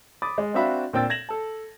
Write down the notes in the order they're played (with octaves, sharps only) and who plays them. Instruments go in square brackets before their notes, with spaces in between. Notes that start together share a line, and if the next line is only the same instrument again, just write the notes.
[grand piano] B5 D6 D#6 A6
G#3
C4 D4 F#4 E5 F5 B5
A#2 C4 D4 G5 E6 A6
G#6 A#6 E7 F#7
A4 A5